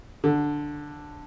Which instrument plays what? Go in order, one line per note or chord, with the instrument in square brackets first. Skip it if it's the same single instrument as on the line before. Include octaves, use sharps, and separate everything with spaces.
[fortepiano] D3